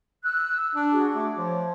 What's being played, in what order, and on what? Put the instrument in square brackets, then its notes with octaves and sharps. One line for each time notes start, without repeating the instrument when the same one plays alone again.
[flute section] E6 F#6
[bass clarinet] D4
[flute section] F#4 G#4
[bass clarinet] A3 [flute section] D6
[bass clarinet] F3 [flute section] C#5